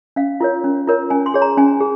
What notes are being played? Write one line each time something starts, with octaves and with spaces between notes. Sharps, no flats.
C#4 F5
F4 A#4 C#5
C#4
F4 A#4 C#5
C#4 G#5
C6
G#4 C#5
A#5
C#4 G#5
G#4